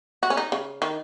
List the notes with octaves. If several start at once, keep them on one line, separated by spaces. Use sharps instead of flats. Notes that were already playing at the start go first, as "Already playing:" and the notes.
F#4
C#4
D#4
C#3
D#3